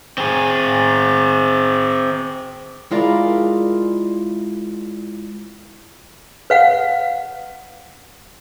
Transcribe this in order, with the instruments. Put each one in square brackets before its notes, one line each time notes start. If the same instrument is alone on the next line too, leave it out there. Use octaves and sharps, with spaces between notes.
[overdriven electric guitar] C4 G#4
[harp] G#3 E4 F4 A#4 D5
[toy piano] B4 F5 F#5